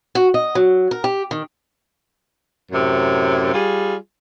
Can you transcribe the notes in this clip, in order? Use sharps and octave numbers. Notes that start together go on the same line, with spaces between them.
F#4
D#5
F#3
A#4
G4
D#3
F#2 A2 C3
G3 F4 G#4